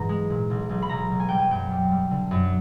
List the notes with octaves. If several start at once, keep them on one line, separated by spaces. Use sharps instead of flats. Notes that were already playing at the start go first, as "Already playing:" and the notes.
Already playing: G#2 E3 A#5
G#3
A#2
B1
B1
B5
B1 A#5
B1
G#5
G3 G5
G#5
F#2 G5
G3
G3
D3
F#2